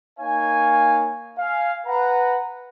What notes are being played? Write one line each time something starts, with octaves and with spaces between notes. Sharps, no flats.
A#3 D#4 C#5 F5 G#5
F5 G#5
B4 F#5 A#5